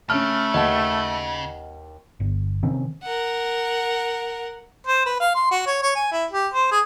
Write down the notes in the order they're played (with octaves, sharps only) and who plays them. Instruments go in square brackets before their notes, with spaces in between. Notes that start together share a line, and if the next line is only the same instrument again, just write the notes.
[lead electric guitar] C#3 [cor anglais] A3 [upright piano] C#4 F6 [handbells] A5
[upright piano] D#2 [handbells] D#5 F#5 A5
[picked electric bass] G1
C3 D#3 C4 C#4
[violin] A#4 F#5
[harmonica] C5
B4
F5
C6
F#4
C#5
C#5
G#5
E4
G4
C5
G#4